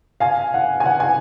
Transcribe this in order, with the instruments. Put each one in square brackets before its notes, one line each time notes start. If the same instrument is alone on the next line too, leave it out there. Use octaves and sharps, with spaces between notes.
[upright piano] F5 G#5
F#5
G#5
F#5
G#5